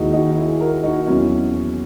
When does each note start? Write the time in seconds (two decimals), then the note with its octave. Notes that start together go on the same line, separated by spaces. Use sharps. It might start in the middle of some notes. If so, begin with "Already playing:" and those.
Already playing: D#2 D#3 G#3 D#4 E4 F#4 G#4
0.13 D#4 F#4
0.37 E4 G#4
0.60 F#4 A#4
0.83 D#4 F#4
1.07 E2 B2 F#3 C#4 E4